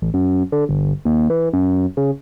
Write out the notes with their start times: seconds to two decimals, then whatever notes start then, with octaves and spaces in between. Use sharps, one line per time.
0.02 A1
0.14 F#2
0.52 D3
0.69 G1
1.05 D#2
1.30 E3
1.53 F#2
1.97 C#3